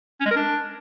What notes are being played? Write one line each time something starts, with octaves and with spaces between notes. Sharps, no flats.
C#4
G#3
A#4
D4